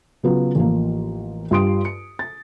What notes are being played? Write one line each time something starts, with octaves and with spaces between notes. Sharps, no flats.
C#3 F#3 B3 F4
A1 F3 A#3
G2 F4 G4 C6 D#6 D7
C#7
A6